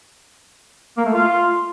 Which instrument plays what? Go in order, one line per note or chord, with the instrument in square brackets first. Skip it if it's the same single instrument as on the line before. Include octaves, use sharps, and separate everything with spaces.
[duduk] A#3
A3
F4